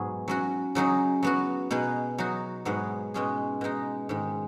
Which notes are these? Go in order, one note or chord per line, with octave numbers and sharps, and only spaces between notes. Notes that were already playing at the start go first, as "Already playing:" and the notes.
Already playing: G#2 B2 F#3 B3 G#4
F#3 C#4 F#4
C#3 F#3 D#4 G#4
F#3 B3 F#4
B2 B3 D#4 G#4
F#3 D#4 F#4
G#2 F#3 B3 G#4
B2 G#3 C#4 G#4
B2 G#3 D#4
G#2 D#3 G#3